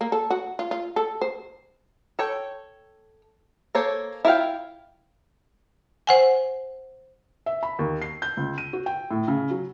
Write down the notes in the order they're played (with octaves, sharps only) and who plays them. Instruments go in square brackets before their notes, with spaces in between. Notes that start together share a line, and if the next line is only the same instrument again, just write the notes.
[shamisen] A#3
A4
F#4
F4
F4
A4
C5
[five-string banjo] A4 C#5 G5
A#3 A4 C5 C#5
E4 F4 A#4 F5 G5
[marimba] C5 F#5 G#5
[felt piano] E5
B5
D#2
C7
G6
C#2
D#7
F#4
G5
A2
C#3
F#3